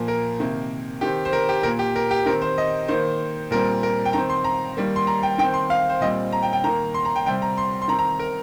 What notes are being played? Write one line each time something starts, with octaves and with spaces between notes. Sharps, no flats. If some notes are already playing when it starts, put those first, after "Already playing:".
Already playing: A#2 F3 A#3
A#4
C3 D#3 A#3
D#3 C4 G4
C5
A#4
G4
A#2 A#3 A#4
G4
A#4
G4
D#3 C4 A#4
C5
D#5
D#3 A#3 C5
A#2 G3 C4 A#4
A#4
G5
D#3 C4 A#5
C6
A#5
D#3 G3 A#3
C6
A#5
G5
D#3 G5
C4
C6
F5
C5
A#2 G3 C4 D#5
A#5
G5
G5
D#3 A#3 A#5
C6
A#5
G5
C3 G3 C4 G5
A#5
C6
C6
D#3 C4 A#5
A#5
A#4